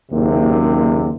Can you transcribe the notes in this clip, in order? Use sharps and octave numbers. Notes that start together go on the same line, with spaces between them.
F#1 D#2 C3